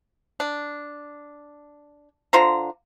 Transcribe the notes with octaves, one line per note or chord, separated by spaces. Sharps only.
D4
D3 F4 C5 A#5